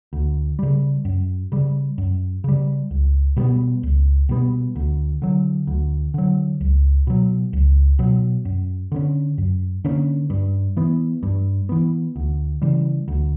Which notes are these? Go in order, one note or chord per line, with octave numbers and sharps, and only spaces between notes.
D2
C#3 G3
F#2
C#3 G3
F#2
C#3 G3
C#2
B2 G3 B3
C#2
B2 G3 B3
D2
D3 F#3
D2
D3 F#3
C#2
B2 F#3
C#2
B2 F#3
F#2
D3 A#3 C#4
F#2
D3 A#3 C#4
G2
E3 B3
G2
E3 B3
D2
C#3 E3 G3
D2